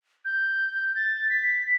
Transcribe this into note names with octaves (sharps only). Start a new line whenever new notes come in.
G6
A6
B6